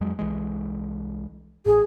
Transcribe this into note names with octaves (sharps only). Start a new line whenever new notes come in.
F2 F#3 G#3
C2 E3 G#3
A1 A2 G#4